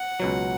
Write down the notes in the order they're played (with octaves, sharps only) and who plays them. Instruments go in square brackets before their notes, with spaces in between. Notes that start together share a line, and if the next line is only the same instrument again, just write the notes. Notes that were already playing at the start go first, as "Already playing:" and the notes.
Already playing: [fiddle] F#5
[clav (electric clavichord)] C#2 B2 F#3